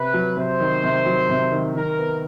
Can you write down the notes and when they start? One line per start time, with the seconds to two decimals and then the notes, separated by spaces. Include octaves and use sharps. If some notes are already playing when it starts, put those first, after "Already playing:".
Already playing: C3 B4
0.14 F#3
0.37 C3 C5
0.60 D#3
0.84 C3
1.06 F#3
1.29 C3
1.52 D#3
1.75 D#3 A#4
1.99 B3